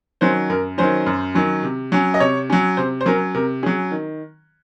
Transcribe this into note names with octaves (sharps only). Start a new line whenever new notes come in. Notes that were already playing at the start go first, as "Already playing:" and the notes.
D#3 F#3 C#4 C5
F#2 A#4
D#3 F#3 C#4 C5
F#2
D#3 F#3 C#4
C3
F#3 C#4
D#5
C3 C#5
F#3 C#4
C3 C5
C5
F#3 C#4 A#4
C3 A#4
F#3 C#4 G#4
D#3